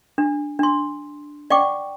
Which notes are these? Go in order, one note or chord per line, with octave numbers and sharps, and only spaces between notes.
D4
D4 C6
D5 F#5 G5 C#6 D6